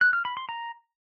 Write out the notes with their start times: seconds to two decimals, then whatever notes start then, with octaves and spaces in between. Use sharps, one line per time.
0.01 F#6
0.13 F6
0.25 B5
0.37 C6
0.49 A#5